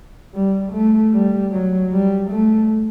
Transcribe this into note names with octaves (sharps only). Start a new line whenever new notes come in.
G3
A3
G3
F#3
G3
A3